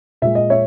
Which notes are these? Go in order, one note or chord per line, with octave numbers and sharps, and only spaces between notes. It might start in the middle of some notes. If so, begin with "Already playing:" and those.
A#2 G#3 E5
D#5
C#5 E5